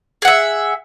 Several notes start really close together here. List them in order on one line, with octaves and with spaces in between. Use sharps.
G#4 F#5 E5